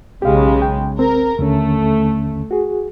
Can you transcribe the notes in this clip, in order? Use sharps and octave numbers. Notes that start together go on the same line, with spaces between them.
B1 C#3 G#3 G4 F5
G5
C4 A#4
D#2 D3 A3 C#4
F#4 G#4